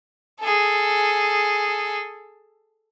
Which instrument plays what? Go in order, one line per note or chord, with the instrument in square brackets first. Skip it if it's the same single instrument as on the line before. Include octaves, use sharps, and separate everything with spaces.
[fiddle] G#4 A4